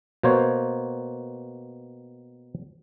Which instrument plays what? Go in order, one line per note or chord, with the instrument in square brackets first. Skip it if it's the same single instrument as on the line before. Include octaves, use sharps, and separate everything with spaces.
[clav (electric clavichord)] B2 A#3 C5 C#5